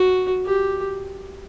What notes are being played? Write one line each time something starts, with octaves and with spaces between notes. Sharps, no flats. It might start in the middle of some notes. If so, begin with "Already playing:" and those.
Already playing: F#4
G4